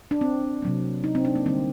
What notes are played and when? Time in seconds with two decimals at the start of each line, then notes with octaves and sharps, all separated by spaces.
0.11 D4
0.21 C4
0.62 C3 F#3 A#3
1.04 D#4
1.15 C4
1.25 D4
1.35 A#3
1.46 D3 G3 A#3 C4